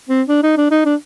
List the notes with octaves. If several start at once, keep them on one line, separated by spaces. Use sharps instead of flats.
C4
D4
D#4
D4
D#4
D4